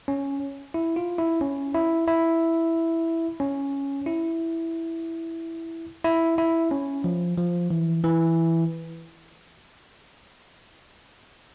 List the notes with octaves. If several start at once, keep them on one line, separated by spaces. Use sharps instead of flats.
C#4
E4
F4
E4
C#4
E4
E4
C#4
E4
E4
E4
C#4
F3
F3
E3
E3